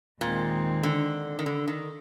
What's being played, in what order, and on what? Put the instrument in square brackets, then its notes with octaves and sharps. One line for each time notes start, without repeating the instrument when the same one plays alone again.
[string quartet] D#2 D#3 G#3 C4 D#4 [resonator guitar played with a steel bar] A#2
[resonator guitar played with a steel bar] D3
D#3
D3
D#3